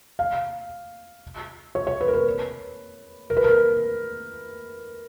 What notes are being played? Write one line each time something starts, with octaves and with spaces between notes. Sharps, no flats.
F5
C#5
C#5
B4
A#4
B4
A#4
B4
A#4